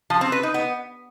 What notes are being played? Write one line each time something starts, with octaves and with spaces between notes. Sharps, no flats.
F3
C4
B4
D#4
B3